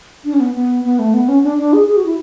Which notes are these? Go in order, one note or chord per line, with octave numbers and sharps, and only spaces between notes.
D4
C#4
B3
B3
B3
A3
B3
C#4
D4
D4
G#4
G#4
F#4
E4